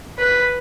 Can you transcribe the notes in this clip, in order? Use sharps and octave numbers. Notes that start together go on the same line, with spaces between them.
B4